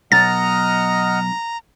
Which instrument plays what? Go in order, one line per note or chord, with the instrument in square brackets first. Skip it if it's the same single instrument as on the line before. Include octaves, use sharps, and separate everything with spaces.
[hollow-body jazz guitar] B1 [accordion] D#5 F#5 F6 [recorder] A#5 [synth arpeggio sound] A6